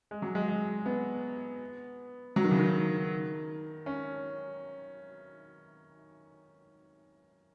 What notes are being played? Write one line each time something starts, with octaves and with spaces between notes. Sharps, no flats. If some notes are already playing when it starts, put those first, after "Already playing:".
G#3
F#3
G#3
G#3
B3
F#3
D#3
C#3
D#3
C#4